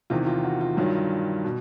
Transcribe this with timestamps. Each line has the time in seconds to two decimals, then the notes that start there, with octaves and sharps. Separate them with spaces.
0.10 E2 C3 D#3 F4
0.27 F4
0.44 F#4
0.61 F4
0.77 G2 D#3 F#3
1.44 B2